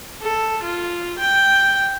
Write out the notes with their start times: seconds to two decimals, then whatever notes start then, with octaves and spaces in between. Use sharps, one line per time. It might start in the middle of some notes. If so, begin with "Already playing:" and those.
0.22 A4
0.63 F4
1.19 G5